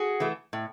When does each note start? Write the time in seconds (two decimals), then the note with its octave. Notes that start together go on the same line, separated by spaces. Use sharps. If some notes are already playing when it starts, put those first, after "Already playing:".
Already playing: F#4 G#4
0.20 E3 A3
0.53 A2